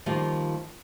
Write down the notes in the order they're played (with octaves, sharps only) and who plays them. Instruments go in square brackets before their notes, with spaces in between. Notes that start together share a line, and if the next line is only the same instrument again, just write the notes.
[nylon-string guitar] D#3 F3 G3 A#3 F4